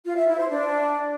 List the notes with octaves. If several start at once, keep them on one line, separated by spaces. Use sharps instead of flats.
F4
E5
E4
C5
D4